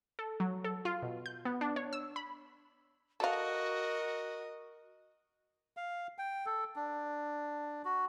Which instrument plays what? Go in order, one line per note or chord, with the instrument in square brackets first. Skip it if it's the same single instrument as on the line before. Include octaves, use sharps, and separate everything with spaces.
[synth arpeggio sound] A4
F#3
A4
F4
B2
G6
B3
D4
C#5
E6
B5
[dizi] F#4 [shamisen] A4 F5 [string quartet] A#4 D#5
[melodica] F5
G5
A4
D4
F#4